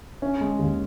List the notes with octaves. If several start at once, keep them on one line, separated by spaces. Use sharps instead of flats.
C#4
G#3
D#2